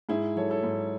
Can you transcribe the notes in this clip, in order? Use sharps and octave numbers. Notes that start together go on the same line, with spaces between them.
G#2 E4 G#4
F#3 A4 C#5
A4 C#5
G#2